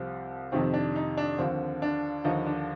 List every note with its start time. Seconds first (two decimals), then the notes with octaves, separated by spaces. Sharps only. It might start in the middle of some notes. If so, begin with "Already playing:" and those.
Already playing: C2 C3 F3 C4
0.52 F2 C3 D#3 C4
0.74 D4
0.96 D#4
1.17 D4
1.38 D#2 D3 F3 C4
1.82 D4
2.24 D#2 D3 F3 D#4
2.46 D4